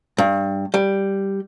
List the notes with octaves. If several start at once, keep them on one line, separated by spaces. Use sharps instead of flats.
G2
G3